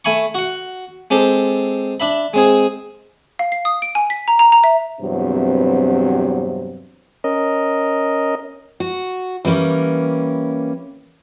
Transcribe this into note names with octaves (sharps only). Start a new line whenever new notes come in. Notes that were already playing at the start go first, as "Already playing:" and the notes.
A3 E5 G#5 B5 C#6
F#4 F#5
G#3 C4 G4 A4
D4 E5 B5
G#3 C4 G#4
F5
C7
D#6
D7
G#5
B6
A#5
A#5
A#5
E5
E2 G2 C3 F#3 C4
C#4 A#4 D#5
F#4
E3 G3 A#3 C#4